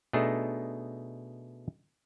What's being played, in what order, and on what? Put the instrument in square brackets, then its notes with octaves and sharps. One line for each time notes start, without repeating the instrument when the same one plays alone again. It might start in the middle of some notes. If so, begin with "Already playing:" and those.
[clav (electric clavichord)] B2 A3 D4 D#4 G#4 A4